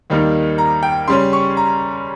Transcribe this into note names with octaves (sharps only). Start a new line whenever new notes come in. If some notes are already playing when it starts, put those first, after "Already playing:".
D#2 D#3 G3 A#3 D#4
A#5
G5
C#3 G3 C#4 C6
C#6
A#5